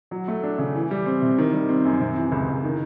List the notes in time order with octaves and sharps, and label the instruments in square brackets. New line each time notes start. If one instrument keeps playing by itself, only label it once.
[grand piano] F#3
A3
D4
C#3
E3
G3
C4
C3
D#3
G3
C4
F#2
C3
E3
C#2
C#2
D#3